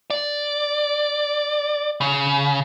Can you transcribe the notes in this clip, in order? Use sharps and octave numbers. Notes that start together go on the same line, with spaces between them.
D5
C#3